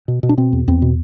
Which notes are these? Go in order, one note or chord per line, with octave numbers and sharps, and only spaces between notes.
B2
B2
D4
B2 C4
E2
E2 C4
B2